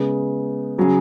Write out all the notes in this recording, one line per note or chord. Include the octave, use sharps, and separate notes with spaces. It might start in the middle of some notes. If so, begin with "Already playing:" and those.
Already playing: C#3 G#3 B3
C#3 F#3 C#4 G#4